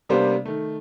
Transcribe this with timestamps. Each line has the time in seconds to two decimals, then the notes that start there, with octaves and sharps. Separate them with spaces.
0.09 C3 G3 A#3 B3 D4 C5
0.45 D#3 A3